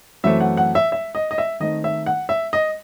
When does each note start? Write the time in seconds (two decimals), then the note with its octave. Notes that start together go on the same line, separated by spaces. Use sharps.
0.24 F#2 E3 A3 C4 E5
0.41 F#5
0.57 F#5
0.75 E5
0.92 E5
1.15 D#5
1.31 D#5
1.38 E5
1.60 D#3 A3 C4 D#4 D#5
1.84 E5
2.06 F#5
2.29 E5
2.53 D#5